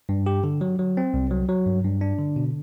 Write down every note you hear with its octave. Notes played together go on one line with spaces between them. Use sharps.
G2
G4
D3
F#3
F#3
C4
C2
F#3
F#3
G2
G2
D4
D3
B2